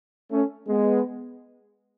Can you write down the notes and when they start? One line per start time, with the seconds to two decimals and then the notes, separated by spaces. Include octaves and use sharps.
0.30 A3 C#4
0.67 G#3 B3